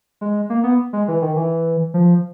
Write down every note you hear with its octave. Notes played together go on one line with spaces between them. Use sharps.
G#3
A#3
B3
G#3
E3
D#3
E3
F3